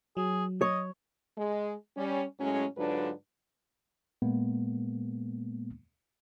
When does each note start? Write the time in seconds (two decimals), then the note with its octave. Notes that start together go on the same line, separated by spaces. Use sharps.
0.17 F#3 G#4
0.61 C#5 D#5
1.38 G#3
1.97 G3 C#4
2.39 A2 F#3 G#3 C#4
2.77 G#2 D3 F#3 D4 F4 B4
4.22 A#2 G#3 A#3 B3